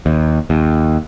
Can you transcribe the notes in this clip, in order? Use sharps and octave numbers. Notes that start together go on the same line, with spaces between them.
D#2
D#2